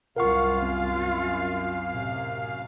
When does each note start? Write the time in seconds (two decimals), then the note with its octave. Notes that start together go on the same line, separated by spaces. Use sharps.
0.16 C2 F#2 F4 A#4 F5 F#5 C#6
0.62 C4
1.91 A2 C3